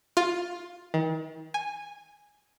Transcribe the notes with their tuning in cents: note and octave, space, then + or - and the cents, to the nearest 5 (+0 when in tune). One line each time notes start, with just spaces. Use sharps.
F4 +10
D#3 +40
G#5 -10